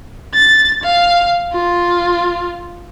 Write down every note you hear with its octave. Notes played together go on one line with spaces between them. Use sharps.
A6
F5
F4